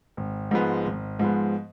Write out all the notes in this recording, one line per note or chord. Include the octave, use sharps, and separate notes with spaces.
G#1
G#2 F3 G#3 B3
G#1
G#2 F3 G#3 B3